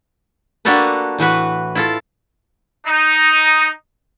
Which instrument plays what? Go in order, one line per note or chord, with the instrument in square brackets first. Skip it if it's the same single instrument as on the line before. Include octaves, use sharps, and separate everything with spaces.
[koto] A#3 D4 F#4 G4 A4 B4
A2 E3 F#4 B4
E4 F4 A4
[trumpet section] D#4